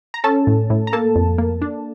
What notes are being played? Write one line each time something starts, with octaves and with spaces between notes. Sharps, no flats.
A#5
C#4 A4 A5
A2
A2
A#5
A#3 A4 A5
F2
A#3
D4